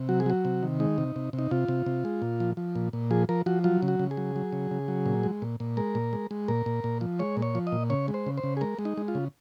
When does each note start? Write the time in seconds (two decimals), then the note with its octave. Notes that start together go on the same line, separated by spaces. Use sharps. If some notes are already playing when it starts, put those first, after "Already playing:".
Already playing: C3
0.09 F#3 F#4
0.20 G#4
0.26 F#3 F#4
0.45 C3
0.63 D#3
0.80 G#3 D#4
0.98 C3
1.16 C3
1.33 C3
1.39 D#4
1.51 C3 F4
1.68 C3
1.86 C3
2.05 G#3
2.22 A#2
2.40 F3
2.57 F3
2.75 A#2
2.93 A#2
3.11 F3 G#4
3.29 F3 A#4
3.46 F3 F#4
3.64 F#3 F4
3.82 C#3
3.88 F#4
3.99 C#3
4.11 G#4
4.17 F#3
4.36 F#3
4.52 C#3
4.71 C#3
4.88 F#3
5.06 A#2
5.23 G#3
5.42 A#2
5.60 A#2
5.77 G#3 A#4
5.95 A#2
6.13 G#3
6.31 G#3
6.48 A#2 A#4
6.66 A#2
6.84 A#2
7.01 F3
7.19 G#3 C#5
7.37 A#2
7.42 C#5
7.55 F3
7.67 D#5
7.72 A#2
7.90 C#3 C#5
8.08 G#3
8.14 C5
8.26 C#3
8.38 C5
8.43 C#3
8.57 G#4
8.61 G#3 A#4
8.79 G#3
8.85 D#4
8.97 G#3
9.08 F4
9.15 C#3